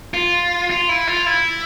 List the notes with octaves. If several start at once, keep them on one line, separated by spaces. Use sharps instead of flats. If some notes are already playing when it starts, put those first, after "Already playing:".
F4
F4
E4
F4
E4